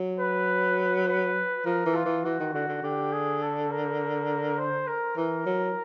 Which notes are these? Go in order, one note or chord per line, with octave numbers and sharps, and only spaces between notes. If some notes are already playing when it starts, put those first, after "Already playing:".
Already playing: F#3
B4
B4
F3 A#4
E3
F4
E3
E3 F#4
D#3
D3 F#4
D3
D3 G4
G#4
A4
A#4
C5
A#4
E3 A#4
F#3